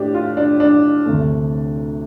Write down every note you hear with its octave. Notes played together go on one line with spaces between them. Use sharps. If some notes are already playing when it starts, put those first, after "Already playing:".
Already playing: A2 A3 D4 G4
F4
D4
D4
D2 C3 A3